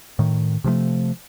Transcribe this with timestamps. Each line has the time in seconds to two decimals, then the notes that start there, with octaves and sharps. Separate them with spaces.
0.19 A2 D#3
0.64 C3 F3 F#3 A3